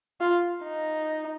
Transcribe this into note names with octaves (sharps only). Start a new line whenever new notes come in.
F4
D#4